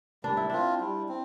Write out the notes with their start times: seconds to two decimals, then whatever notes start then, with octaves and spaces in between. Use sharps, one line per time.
0.23 G3 D4
0.37 E4
0.50 C4 D4 F4
0.80 G3
1.08 C4